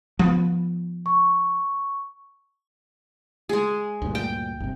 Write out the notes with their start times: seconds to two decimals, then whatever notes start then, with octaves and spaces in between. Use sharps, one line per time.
0.19 F3 B3
1.06 C#6
3.49 G#3 G#4
4.02 D2 G2 A#2
4.15 G5
4.60 G1 C3